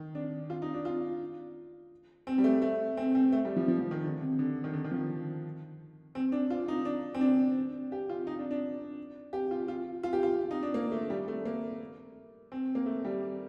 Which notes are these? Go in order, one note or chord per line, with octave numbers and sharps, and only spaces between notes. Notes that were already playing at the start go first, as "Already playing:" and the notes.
Already playing: D#3
D4
F4
D#4
D4
F4
C4
G3
A3
A3
C4
C4
A3
G3
F3
F3
F3
D#3
D3
C3
D3
D#3
D3
D#3
F3
C4
D4
F4
D#4
D4
C4
D4
G4
F4
D#4
D4
D4
G4
F4
F4
F4
G4
F4
D#4
D4
A#3
A3
G3
A3
A#3
C4
A#3
A3
G3